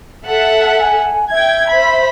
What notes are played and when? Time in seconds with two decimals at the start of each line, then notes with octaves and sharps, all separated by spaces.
0.24 A4 E5 F#5
0.80 G#5
1.31 E5 G5 G#6
1.69 C5 B5